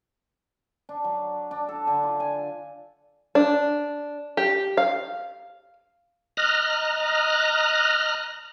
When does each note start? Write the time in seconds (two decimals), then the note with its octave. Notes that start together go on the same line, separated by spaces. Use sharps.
0.89 D4
1.04 F#3
1.51 D4
1.69 A4
1.87 D3
2.03 F4
2.20 G#5
3.35 D4
4.37 G4
4.77 F5
6.37 D#5 A#5 F6 F#6